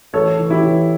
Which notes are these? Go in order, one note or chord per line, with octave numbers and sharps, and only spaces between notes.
A1 A4 C#5
E3
E4 G4
E3